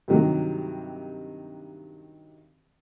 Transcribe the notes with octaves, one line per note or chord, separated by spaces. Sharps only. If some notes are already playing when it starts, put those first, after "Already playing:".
G2 C3 D#3 F#3 G3